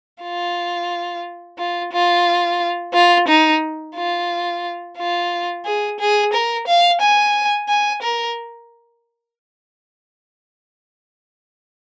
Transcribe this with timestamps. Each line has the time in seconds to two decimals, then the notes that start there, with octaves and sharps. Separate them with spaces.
0.22 F4
1.58 F4
1.93 F4
2.94 F4
3.28 D#4
3.95 F4
4.98 F4
5.65 G#4
6.00 G#4
6.33 A#4
6.67 F5
7.01 G#5
7.68 G#5
8.02 A#4